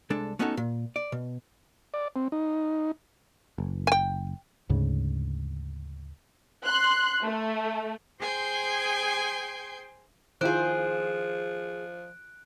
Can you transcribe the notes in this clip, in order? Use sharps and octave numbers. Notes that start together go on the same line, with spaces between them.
C2 G#3 D4 A4
A3 B3 C#4 D#4 F#4 A4
A#2
D5
B2
D5
C4
D#4
F#1
G5 G#5
D2 G#2 C#3
C6 F#6
A3
G#4 C5 G5 G#5 C6 G6
D#3 F3 E4 F4 G#4 C5 F#6 D7